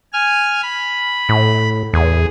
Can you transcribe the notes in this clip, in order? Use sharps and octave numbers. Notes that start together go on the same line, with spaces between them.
G#5 F6
B5
A2
E2 G#4